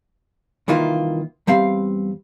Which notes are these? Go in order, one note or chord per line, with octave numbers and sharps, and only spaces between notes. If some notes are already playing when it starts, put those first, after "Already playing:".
C2 D#3 E3 A#3 F4
E2 G3 C4 F5